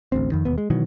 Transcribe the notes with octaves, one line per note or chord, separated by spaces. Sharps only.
A1 D2 C4
F2 D#3
E1 D#2 B3
G#3
B2 D#3 E3 F#3